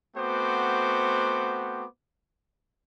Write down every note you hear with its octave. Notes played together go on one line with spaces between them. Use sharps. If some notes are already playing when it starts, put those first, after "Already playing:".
A3 B3 C4 F#4 C5 D6